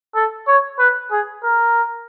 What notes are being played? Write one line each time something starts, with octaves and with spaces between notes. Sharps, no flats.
A4
C#5
B4
G#4
A#4